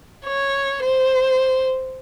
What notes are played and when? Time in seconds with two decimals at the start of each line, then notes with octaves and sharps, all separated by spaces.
0.24 C#5
0.83 C5